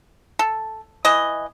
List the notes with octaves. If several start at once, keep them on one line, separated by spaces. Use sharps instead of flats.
A4
E3 D#5